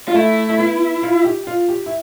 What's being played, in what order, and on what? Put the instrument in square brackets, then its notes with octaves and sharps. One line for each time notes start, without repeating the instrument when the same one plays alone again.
[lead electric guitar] F4
[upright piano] A3 [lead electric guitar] E4
[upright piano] A3
B3
F4
G4
F4
G4
E4